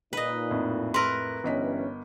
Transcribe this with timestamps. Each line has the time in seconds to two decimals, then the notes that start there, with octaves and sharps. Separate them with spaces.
0.13 A#2 D#4 B4 D#5
0.51 F2 A2
0.94 A#4 B4 C6 E6
1.44 G1 G2 E3 C#4 D#5 B6